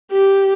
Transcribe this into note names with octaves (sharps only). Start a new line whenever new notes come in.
G4